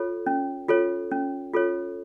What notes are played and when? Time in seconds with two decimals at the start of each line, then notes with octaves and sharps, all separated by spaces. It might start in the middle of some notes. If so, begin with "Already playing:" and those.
Already playing: F4 A4 C#5
0.26 C#4
0.68 F4 A4 C#5
1.11 C#4
1.54 F4 A4 C#5